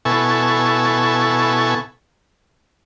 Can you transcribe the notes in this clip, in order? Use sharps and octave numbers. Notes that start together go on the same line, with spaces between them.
B2 E4 A4 G#5 C#6